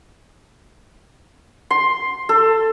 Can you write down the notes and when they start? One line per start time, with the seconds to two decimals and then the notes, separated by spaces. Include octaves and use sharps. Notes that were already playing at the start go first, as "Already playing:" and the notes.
1.71 C6
2.29 A4